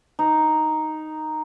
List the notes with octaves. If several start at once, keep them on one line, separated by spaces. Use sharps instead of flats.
D#4